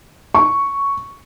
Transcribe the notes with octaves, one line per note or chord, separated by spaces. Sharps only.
C#6